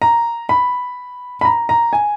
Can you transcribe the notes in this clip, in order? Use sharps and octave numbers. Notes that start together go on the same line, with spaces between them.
A#5
B5
B5
A#5
A#5
G#5